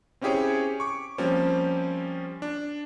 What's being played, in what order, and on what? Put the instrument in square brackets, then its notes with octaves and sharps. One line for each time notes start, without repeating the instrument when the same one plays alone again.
[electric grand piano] C4 C#4 E4 G4 G#4 C#5
C#6 D6
F3 G3 A#3 C4 C#4
D4